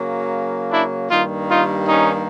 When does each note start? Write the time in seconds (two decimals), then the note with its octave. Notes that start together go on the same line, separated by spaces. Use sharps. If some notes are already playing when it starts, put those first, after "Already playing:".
Already playing: C#3 F#3 A#3
0.71 D4 E4
1.10 G2 D#3 G3 A#3 D#4 F4
1.49 D#4 F4
1.87 C#4 D#4